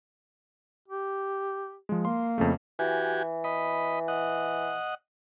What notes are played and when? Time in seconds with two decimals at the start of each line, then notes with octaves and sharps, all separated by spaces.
0.88 G4
1.89 F3 G#3
2.05 A#3 C6
2.38 F2 C#3 A3
2.79 E3 F#4 G4 G#5
3.44 D#5 B5
4.08 D#5 F#5